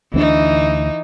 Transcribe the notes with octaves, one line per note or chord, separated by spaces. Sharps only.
D2 E3 B3 D4 D#4